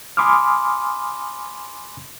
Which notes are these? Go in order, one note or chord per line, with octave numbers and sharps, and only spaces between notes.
G#5 B5 C6 D6 D#6 F6